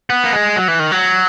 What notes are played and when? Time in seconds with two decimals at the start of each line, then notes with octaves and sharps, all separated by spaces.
0.10 B3
0.24 A#3
0.33 G#3
0.56 F#3
0.68 E3
0.79 D#3
0.92 F#3